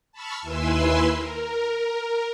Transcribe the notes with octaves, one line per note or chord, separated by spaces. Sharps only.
A5 B5 C#6 E6 F6
D#2 E4 B4 G#5 C6 E6
A#4